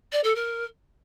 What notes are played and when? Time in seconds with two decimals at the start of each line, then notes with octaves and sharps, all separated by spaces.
0.12 D5
0.24 A4
0.35 A#4